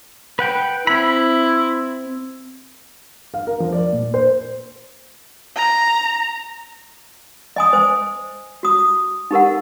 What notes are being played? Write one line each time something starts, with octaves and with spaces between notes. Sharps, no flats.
B4 F#5 G5
C4 E4 B5
F5
A#4
F3
D5
A#2
C5
A#5
D#5 G#5 D#6
C5 G#5
F#4 D#6
D#4 G4 A#4 F#5